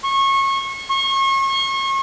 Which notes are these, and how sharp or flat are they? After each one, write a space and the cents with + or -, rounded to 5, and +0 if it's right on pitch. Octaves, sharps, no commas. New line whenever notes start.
C#6 -25
C#6 -35